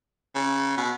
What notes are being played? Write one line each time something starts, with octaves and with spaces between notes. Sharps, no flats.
C#3
B2